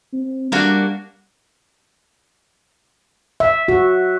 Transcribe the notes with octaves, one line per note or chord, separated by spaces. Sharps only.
C4
G3 A#3 D4 F#4
E5
F#4